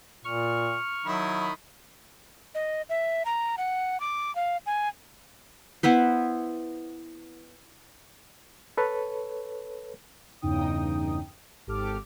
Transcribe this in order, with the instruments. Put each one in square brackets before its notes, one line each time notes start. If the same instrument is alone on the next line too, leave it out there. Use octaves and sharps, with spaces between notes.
[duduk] A#2 [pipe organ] C#6 F6
[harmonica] D#3 E4 B5 [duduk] F#3
[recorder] D#5
E5
A#5
F#5
D6
F5
G#5
[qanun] B3 E4 B4 C5
[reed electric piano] A4 B4 C#5
[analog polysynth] E2 G2 C#3 D#4 G5 D#6
G#1 G#2 G4 A4 D6 F6